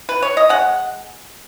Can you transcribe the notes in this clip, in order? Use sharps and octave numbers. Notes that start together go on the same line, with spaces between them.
B4
C#5
D#5
G#3 F#5